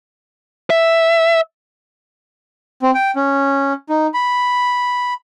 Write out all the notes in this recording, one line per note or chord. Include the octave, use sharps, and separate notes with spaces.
E5
C4
G5
C#4
D#4
B5